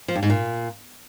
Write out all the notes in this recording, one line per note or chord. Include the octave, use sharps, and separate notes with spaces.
F3
G2
G#2
A#2